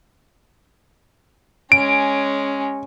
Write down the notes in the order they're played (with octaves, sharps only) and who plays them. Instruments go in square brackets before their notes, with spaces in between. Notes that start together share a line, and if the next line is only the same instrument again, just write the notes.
[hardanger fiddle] G#3 C#4 [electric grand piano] D7